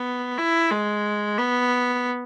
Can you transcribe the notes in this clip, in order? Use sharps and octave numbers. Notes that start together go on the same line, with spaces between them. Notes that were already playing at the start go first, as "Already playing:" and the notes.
Already playing: B3
E4
G#3
B3